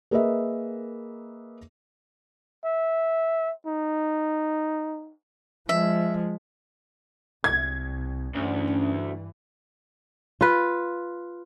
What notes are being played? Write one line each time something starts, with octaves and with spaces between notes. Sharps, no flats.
A#3 G#4 A#4 B4 D#5 E5
E5
D#4
F3 G#3 E5
C2 G#6
D2 G2 E3 C#4
F4 B4